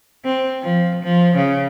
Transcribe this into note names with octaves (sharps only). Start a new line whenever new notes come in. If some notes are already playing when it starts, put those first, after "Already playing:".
C4
F3
F3
C#3